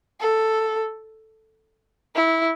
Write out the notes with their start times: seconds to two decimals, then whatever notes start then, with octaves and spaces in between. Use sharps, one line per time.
0.20 A4
2.15 E4